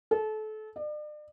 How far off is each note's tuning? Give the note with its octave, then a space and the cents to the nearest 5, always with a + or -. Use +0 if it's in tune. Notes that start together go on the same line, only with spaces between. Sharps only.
A4 -30
D5 +40